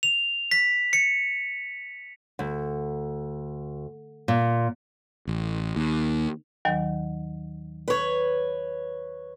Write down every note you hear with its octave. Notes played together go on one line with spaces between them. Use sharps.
F7
B6
C#7
D2
A#2
A1
D#2
D#2 D#3 F#3
B4 C#5